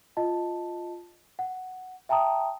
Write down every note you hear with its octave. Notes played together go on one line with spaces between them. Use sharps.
F4 D#5 A5
F#5
E5 G5 A5 A#5 D#6